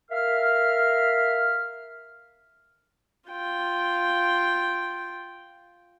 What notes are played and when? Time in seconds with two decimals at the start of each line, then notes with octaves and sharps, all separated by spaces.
0.11 A#4 E5 F5 F6
3.30 F4 G5